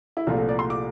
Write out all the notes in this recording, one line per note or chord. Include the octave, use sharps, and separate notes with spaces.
E4
C2 A#2 F3 A3 F4
A4
D5
C6
D6